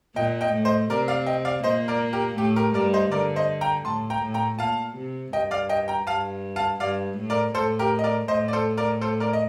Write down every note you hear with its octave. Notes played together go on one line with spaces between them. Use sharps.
A#2 A#3 D#5 G5
D#5 G5
A2 A3
C5 D#5
C3 C4 A#4 D5
D5 F5
D#5 G5
D5 F5
A#2 A#3 C5 D#5
A#4 D5
G4 A#4
A2 A3 G4
G4 A#4
G2 G3 A#4 D5
C5 D#5
D3 A#4 D5
C5 D#5
G5 A#5
A2 A5 C6
G5 A#5
A2
G5 A#5
A#2 F5 A5
C3
G2 D#5 G5
D5 F5
D#5 G5
G5 A#5
G2 F5 A5
F5 A5
G2 D5 F5
A2
A#4 D5
A2 A4 C5
G4 A#4
D#5
A#4 D5
A2 C5 D#5
D5
A4 C5
A#4 D5
A4 C5
A#4 D5
D#5